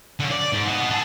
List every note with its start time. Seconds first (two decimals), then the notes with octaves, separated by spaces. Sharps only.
0.20 D3 C#4
0.31 D5
0.52 G#2
0.67 F#4 D#5
0.91 G#4 A4